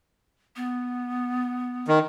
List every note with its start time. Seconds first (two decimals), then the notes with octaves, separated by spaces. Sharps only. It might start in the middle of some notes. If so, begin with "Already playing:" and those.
0.56 B3
1.88 D#3